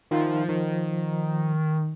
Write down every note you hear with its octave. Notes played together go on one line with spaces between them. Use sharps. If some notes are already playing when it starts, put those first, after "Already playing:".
D#3 F3 D#4 F4
D#3 F3